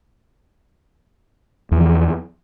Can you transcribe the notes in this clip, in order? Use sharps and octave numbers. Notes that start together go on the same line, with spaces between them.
E2 E3 F3